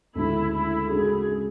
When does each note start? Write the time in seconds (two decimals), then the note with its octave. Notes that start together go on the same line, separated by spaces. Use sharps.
0.15 D2 C#3 G#3 E4
0.53 E4
0.91 C#3 G#3 D4 F#4 G#4